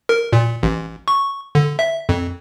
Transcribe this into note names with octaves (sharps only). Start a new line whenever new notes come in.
A#4
A#2
A1
C#6
D3
E5
F2